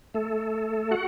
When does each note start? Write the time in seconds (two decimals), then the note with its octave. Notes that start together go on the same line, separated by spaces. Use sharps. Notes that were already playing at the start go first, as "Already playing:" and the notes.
0.14 A3 A4
0.91 F#4 F#5